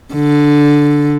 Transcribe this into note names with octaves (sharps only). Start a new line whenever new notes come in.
D3